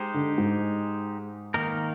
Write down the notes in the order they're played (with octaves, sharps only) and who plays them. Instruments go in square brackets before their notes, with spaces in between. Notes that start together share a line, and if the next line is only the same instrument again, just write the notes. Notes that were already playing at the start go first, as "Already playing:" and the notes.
Already playing: [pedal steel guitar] G#3 D#4 G4 C5
[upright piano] D3
G#2
[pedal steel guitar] D#3 A#3 D#4 A#4